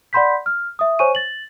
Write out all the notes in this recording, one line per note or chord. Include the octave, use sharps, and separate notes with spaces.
D5 F#5 B5 C6 G6 B6
F6
E5 D#6
C5 C#5 G#5 C#6 D#7
A6 F#7